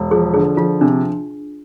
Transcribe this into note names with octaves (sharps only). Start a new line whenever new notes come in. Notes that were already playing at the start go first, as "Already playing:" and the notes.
Already playing: E1
F3 G#4
D3 G#4
F3 F4
C3 D4